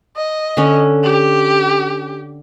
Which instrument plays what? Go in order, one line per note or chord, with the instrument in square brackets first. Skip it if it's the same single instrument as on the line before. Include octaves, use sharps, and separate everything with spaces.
[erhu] D#5
[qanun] D3 C#4
[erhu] G4